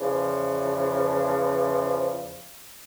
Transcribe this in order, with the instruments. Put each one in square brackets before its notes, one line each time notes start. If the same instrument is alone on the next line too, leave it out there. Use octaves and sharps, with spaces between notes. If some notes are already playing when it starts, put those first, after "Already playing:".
[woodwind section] E2 C#3 E3 F3